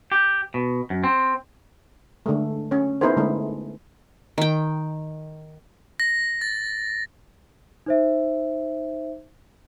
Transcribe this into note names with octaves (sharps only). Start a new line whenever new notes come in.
G4
B2
F#2
C4
D3 G#3 A3
C#4 C#5
B3 D#4 E4 G#4 A#4 C5
D3 G#3 A3 E4
D#3 G5
A#6
A6
D#4 C5 E5